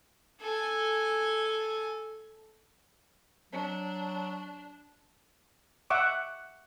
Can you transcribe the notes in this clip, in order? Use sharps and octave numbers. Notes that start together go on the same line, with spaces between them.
A4 G#5
F#3 D4
E5 F#5 C#6 D6